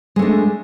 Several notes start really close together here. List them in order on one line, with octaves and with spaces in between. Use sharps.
G#3 A3 D4